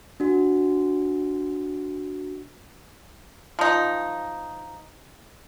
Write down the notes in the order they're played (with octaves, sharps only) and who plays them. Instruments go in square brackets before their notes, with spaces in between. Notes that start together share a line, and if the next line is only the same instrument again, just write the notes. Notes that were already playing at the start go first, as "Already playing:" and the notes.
[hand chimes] D4 F#4
[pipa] F3 D#4